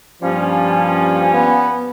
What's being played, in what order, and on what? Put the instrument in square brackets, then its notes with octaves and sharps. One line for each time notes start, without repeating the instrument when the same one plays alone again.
[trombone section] G2 F3 [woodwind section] G3 A#3 C#4
[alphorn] B3